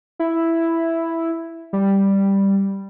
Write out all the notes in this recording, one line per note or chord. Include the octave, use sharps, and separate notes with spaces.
E4
G3